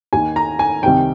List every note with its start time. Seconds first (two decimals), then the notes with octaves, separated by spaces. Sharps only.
0.13 D#2 D#3 G#5
0.36 A#5
0.59 G#5
0.83 C2 C3 D#3 G5